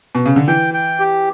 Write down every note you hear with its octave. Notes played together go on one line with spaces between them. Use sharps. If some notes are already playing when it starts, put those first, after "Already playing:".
B2
C#3
D3
E3 G5
G5
G4